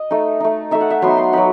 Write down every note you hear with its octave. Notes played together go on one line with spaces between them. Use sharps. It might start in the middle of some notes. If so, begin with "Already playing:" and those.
Already playing: D#5
A3 D#4
A3 D#4
A3 D#4 E5
F#5
E5
F#3 B3 D#4 C6
C6
F#3 B3 D#4 B5